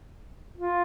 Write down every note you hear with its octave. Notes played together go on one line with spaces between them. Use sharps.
F4